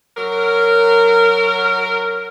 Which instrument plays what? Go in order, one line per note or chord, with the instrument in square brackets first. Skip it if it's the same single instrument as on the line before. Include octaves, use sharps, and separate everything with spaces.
[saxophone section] F#3 A#4